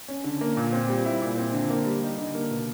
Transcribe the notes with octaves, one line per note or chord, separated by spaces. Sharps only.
C#4
D3
A#3
A#2
C4
G3
E4
A#2
C4
D3
A#3
G3
D#4
D3
A#3
B2